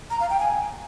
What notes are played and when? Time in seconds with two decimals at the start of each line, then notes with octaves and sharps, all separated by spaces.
0.10 A#5
0.20 F5
0.30 G5
0.40 G#5